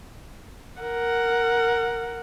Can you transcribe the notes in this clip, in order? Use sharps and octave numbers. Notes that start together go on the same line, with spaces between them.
A#4 F#5